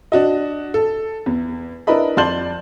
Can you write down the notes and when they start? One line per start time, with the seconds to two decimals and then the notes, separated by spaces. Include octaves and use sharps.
0.12 D4 F#4 D#5
0.74 A4
1.26 E2
1.87 D4 E4 A#4 B4 D#5 B5
2.17 F2 D5 A5 C6 G6 F#7